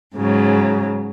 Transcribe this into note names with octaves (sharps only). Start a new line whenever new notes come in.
G#2 C#3 F#3